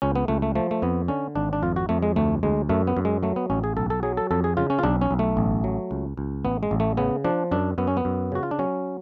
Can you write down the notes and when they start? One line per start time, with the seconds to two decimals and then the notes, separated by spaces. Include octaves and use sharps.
0.02 C#2 C#4
0.16 B3
0.28 C#2 A3
0.42 A3
0.55 F3 A3
0.71 A3
0.82 F2 B3
1.08 D3 C#4
1.35 G#1 D4
1.53 D4
1.62 F2 F4
1.76 F#4
1.89 F2 A3
2.03 G#3
2.16 D2 A3
2.43 D2 G#3
2.69 F#2 A3
2.87 B3
2.97 F#2
3.05 G#3
3.23 F#3 A3
3.36 B3
3.50 A1 C#4
3.64 G#4
3.77 B1 A4
3.90 A4
4.03 F#3 G#4
4.17 A4
4.31 F2 A4
4.44 G#4
4.57 C#3 F4
4.70 C#4
4.79 F4
4.83 B1 D4
5.01 C#4
5.11 B1
5.19 A3
5.37 A1
5.64 F#3
5.91 C#2
6.17 C#2
6.45 A1 B3
6.63 G#3
6.71 A1
6.80 A3
6.97 C#3 B3
7.24 F3 D4
7.51 F#2 D4
7.78 F#2 B3
7.87 C#4
7.97 B3
8.05 F#2
8.32 C#3 F#4
8.43 F4
8.51 D4
8.59 F#3 C#4